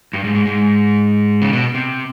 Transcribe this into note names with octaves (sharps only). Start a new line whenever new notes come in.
G2
G#2
G#2
G#2
C#3
B2
C3